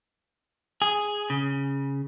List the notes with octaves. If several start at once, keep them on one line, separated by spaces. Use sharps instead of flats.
G#4
C#3